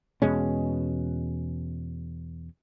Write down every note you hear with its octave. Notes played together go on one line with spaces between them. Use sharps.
E2 B2 G#3 C#4